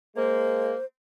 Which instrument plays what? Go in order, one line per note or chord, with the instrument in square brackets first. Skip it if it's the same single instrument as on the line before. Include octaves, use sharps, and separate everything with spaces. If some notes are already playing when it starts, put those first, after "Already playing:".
[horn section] G#3 A#3 [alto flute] C5